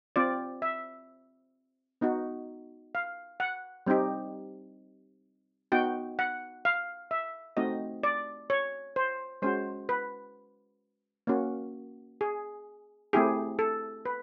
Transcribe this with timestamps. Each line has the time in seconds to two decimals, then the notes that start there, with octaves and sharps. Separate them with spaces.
0.16 C4 F4 D5
0.62 E5
2.01 B3 D#4 F#4
2.95 F5
3.40 F#5
3.87 G3 C4 D#4 G4
5.72 B3 D#4 F#4 G5
6.19 F#5
6.65 F5
7.11 E5
7.57 A3 C4 D#4 F#4 D#5
8.03 D5
8.50 C#5
8.96 C5
9.42 G#3 C#4 F#4 C5
9.89 B4
11.27 A#3 C#4 F#4
12.21 G#4
13.13 A3 C4 E4 G4 G#4
13.59 A4
14.05 B4